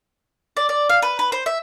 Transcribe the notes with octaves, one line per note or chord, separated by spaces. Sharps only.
D5
D5
F5
B4
B4
C5
E5